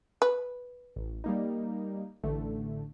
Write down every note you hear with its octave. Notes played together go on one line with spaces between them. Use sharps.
B4
A1
G3 A#3 D#4
A1 D3 A3